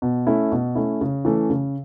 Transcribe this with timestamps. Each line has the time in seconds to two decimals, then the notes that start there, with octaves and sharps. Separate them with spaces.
0.02 B2
0.27 A3 C#4 E4
0.52 B2
0.75 A3 C#4 E4
1.01 C#3
1.25 E3 A3 C#4
1.50 C#3